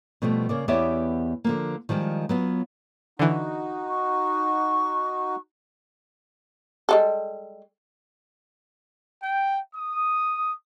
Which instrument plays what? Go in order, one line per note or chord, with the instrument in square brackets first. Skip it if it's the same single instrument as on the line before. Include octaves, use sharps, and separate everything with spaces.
[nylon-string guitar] B2 F3 G3 A3 B3
C#3 A#3 D5
E2 B3 G4 C#5 D5 E5
D3 F3 A#3
D#3 F3 G3 G#3
F#3 B3 F4
[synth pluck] D3 E3 [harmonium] D#4 F#4
[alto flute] C#6
[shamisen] G3 G#3 A4
[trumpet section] G5
D#6